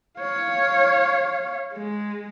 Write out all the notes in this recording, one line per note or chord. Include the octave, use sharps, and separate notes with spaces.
C#5 F5
G#3